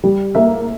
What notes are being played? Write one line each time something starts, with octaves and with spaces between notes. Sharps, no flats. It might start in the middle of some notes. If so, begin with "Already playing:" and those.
G3
A#3 E5